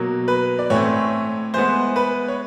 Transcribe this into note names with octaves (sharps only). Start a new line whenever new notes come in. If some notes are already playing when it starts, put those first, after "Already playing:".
Already playing: B2 F#3 A#3
B4
D5
A2 E3 A3 C4 C#5
E3 G#3 B3 C5
B4
C#5